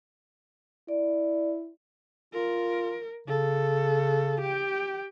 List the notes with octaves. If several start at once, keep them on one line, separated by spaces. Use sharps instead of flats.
E4 D5
F4 A#4
C#3 A4
G4 G5